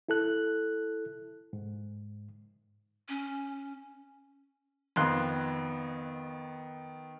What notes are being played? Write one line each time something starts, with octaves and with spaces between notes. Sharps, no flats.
E4 A4 F#6
G#2
C#4
F2 D#3 B3 C6 F#6